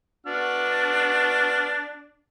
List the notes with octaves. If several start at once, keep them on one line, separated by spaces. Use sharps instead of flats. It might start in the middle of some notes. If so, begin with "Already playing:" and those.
B3 D4 F#4 F6